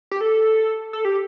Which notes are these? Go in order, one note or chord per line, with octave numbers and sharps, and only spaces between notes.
G4
A4
A4
G4